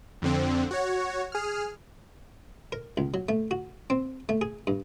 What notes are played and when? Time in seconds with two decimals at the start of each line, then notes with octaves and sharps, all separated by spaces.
0.22 F2 D3 C4
0.71 F#4 C#5
1.32 G#4 F6
2.72 A#4
2.97 C#2
3.14 F#3
3.29 A3
3.51 F#4
3.90 C4
4.29 A3
4.41 G#4
4.67 G2